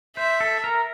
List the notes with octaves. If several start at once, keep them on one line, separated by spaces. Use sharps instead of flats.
C5 E5
A4
A#4